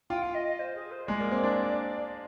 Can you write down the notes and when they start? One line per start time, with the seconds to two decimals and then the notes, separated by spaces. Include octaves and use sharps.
0.10 F4 G5
0.22 F5
0.34 D#5
0.47 D#5
0.59 C5
0.75 G#4
0.91 C5
1.07 G#3 D5
1.20 A#3
1.31 C4
1.44 D4